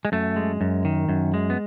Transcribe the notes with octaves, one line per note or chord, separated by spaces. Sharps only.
G#3
F#2 A3
G#3
F#2
D#3
F#2
G#3
B3